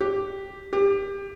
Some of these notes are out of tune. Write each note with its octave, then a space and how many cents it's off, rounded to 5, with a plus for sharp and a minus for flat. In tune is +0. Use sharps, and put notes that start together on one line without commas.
G4 +0
G4 +20